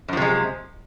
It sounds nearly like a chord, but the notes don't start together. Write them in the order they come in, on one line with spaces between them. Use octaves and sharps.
F#2 F3 C3 G#3